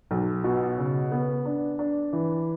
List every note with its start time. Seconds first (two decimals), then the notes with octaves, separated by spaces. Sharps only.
0.11 B1
0.44 B2
0.78 C#3
1.12 B3
1.45 D4
1.79 D4
2.13 E3